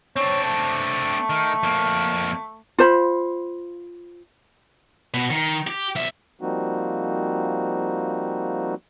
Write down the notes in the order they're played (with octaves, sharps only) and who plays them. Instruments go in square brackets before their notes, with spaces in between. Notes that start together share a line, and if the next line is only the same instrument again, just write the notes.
[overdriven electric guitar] C4 D4 [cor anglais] C#5
[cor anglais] A3
[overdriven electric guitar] D#3
F2 A#3
[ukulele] F4 C5 B5
[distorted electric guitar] B2
D#3
G4
B1 E5
[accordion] F3 G3 A#3 C4 D#4 F#4